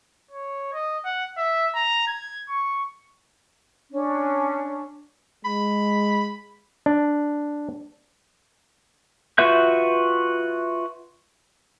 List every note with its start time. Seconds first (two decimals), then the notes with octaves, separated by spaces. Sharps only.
0.31 C#5
0.73 D#5
1.05 F#5
1.37 E5
1.75 A#5
2.07 G#6
2.49 C#6
3.91 C#4 D4
5.45 G#3 B5
6.86 D4
9.38 F4 F#4 B4 E5 G6